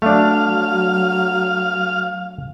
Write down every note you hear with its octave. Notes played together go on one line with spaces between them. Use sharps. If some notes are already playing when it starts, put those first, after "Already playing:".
F#3 A3 D4 F5